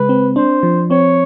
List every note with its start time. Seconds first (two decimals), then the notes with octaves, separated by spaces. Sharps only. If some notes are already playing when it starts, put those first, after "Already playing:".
Already playing: C#3 G#3 B4
0.09 C4
0.36 D4 C5
0.63 F3
0.91 C4 C#5